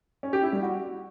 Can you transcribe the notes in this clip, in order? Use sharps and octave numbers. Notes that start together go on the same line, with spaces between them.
C#4
G4
E4
G3
F#4